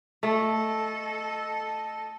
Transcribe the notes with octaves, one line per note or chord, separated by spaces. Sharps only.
A3 A4 D#5